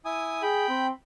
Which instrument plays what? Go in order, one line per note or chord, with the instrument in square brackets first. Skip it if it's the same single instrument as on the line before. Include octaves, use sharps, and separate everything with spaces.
[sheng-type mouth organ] E4 G#5 D#6
[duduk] G#4 [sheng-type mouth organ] G5 B5
[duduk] C4